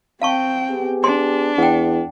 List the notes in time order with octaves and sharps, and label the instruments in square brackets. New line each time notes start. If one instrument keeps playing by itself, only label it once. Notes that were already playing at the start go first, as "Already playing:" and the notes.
[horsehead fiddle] C4 G5 [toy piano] F5 A5 C#6
[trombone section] B3 G4 G#4
[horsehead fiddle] D4 [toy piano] C6
[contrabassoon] E2 [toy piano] F#5 G5